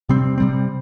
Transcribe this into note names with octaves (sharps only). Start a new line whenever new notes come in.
C3 G3 C4
C3 G3 C4